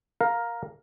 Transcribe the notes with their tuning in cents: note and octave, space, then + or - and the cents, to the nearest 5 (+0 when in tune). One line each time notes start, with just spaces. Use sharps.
A#4 +5 F5 +15